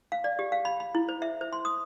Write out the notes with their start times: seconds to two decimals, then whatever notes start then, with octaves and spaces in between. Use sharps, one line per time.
0.12 F5
0.24 D5
0.39 G4
0.52 F5
0.65 B5
0.80 B5
0.95 E4
1.09 C5
1.22 E5
1.41 C5
1.53 C6
1.65 D#6